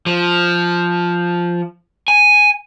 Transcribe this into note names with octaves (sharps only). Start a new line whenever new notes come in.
F3
G#5